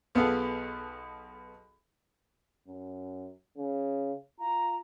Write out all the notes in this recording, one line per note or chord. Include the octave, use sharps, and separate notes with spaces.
B1 B3 F4 G#4 A4 F#5
F#2
C#3
F4 A#5